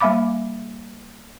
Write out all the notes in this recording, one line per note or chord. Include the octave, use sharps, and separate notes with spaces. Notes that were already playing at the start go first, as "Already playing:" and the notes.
G3 A#3 E5 F5 B5 D6